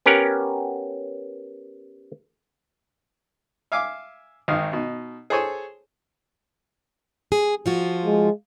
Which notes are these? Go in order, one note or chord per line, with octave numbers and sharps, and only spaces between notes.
B3 C#4 G4 A#4 F#5
E5 F5 G#5 D6
G#1 D#3 D#4 F5
B2 D#4
G#4 A4 C5 C#5 G#5
G#4
F3 F4 F#4
G#3